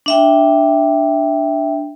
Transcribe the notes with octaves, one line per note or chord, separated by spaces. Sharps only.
D4 E5 G5